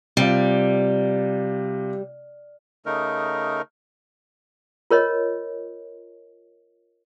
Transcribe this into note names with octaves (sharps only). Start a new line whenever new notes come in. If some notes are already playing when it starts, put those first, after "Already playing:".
C3 G3 F4
C#3 A3 D#4 A#4
F4 A#4 C#5 D#5